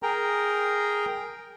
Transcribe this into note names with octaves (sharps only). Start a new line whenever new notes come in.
G#4 A#4 G5 A#5